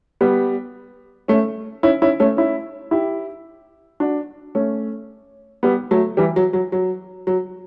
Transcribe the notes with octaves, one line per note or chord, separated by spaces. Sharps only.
G3 B3
A3 C#4
C#4 E4
C#4 E4
A3 C#4
C#4 E4
E4 G4
D4 F#4
A3 C#4
G3 B3
F#3 A3
E3 G3
F#3
F#3
F#3
F#3